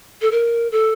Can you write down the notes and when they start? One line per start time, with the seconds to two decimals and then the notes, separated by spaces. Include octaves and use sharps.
0.22 A4
0.31 A#4
0.72 A4